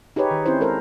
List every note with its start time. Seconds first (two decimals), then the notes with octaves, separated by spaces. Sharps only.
0.16 D#4 G4 G#4 B4 C#5
0.31 D#3
0.46 C4 C#4 E4 C5
0.60 G#3 A4 A#4 C5